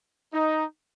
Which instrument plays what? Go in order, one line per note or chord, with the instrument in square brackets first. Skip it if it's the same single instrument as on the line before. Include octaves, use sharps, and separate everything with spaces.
[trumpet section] D#4